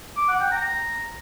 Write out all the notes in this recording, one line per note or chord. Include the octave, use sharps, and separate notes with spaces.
D6
F#5
G5
A#5